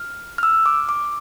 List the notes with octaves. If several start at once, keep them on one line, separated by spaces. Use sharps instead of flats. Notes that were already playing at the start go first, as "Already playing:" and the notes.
Already playing: F6
F6
E6
D6
D6